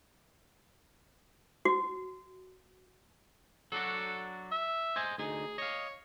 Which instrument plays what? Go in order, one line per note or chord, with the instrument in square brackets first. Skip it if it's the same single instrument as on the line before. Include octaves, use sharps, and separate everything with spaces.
[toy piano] F#4
[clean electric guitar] F#3 D4 F#4 [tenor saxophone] A4
[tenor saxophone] E5
[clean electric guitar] C5 D#5 G#5
[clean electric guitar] D2 D#4 [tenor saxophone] G#4
[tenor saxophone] C#5 [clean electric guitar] D#5 F5